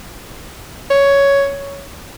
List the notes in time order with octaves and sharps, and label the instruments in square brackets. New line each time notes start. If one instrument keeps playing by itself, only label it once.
[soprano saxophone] C#5